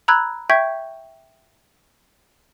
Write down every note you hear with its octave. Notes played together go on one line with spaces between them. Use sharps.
A#5 B5 E6 F#6 G#6
E5 G5 C#6 G6 G#6 B6